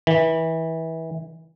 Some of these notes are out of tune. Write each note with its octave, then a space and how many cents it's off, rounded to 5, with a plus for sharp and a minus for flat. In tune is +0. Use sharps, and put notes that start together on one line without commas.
E3 -25